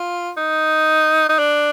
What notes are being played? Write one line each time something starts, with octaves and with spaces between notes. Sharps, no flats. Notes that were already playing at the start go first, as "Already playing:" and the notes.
Already playing: F4
D#4
D#4
D4